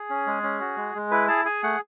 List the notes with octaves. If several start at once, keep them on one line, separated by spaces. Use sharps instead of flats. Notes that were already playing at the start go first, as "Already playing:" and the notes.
Already playing: G#4
C#4
G#3
C#4
F#4
G#3
G#3
E4 B4
G#4 A5
G#4 G#5
A3 F#5